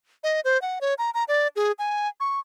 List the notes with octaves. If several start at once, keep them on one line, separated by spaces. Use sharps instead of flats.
D#5
C5
F#5
C#5
A#5
A#5
D5
G#4
G#5
C#6